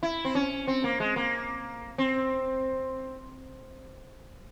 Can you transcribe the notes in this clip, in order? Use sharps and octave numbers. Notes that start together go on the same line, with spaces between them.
E4
C4
C#4
C4
A#3
G#3
A#3
C4